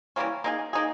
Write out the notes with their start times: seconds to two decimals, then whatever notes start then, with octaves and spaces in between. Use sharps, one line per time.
0.16 E3 G3 A#3 C#4
0.44 A#3 D#4 G#4
0.73 A#3 D#4 G#4